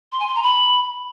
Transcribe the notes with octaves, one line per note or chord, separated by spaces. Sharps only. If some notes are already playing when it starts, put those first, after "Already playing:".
C6
G#5
C6
A#5
B5